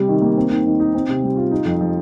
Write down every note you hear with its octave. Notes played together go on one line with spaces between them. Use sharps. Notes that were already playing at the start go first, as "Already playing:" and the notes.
Already playing: C3 G3
D#3
A#3
C4
D#2
D#3
D#4
C4
C3
G3
F4
D#4
F2
F3